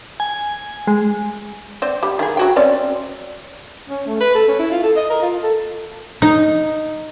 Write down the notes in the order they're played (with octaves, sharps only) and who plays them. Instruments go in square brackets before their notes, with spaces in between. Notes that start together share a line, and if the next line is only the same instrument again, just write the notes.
[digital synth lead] G#5
G#3
[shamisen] C4 C5 D5
G3
D#3 G#4
F#3 F#4 G5
C4 C#4 D5
[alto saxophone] C#4
A3
B4
A4
C#4
E4
F4
A4
D#5
A#4
F4
A4
[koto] D#4